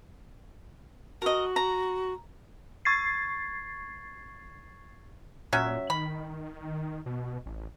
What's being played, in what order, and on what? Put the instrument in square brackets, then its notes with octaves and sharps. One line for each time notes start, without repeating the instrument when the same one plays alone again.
[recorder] F#4 [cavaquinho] A#4 D#5
[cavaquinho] A#5
[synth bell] C#6 G#6 A6 C7
[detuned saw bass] A#2 [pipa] F#3 C#4 E5
[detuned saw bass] D#3 [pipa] B5
[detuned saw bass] B2
A1